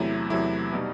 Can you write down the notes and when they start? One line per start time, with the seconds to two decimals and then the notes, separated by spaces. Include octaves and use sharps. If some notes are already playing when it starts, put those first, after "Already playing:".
Already playing: E2 C3 F#3 A3 E4
0.30 E2 C3 F#3 A3 E4
0.72 B2 G3 D#4